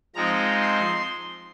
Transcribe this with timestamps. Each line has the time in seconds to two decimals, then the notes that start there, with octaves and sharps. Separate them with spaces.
0.15 F3 G#3 C4 D#4 A#5
0.61 C6